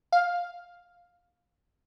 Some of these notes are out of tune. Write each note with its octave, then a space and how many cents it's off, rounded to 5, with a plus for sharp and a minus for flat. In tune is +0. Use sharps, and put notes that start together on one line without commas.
F5 +5